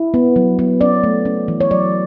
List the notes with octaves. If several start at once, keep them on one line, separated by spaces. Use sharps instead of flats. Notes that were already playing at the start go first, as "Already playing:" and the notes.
Already playing: E4
B3
F#3
B3
C#4 D5
A3
C#4
E3
C#5
F#3 D5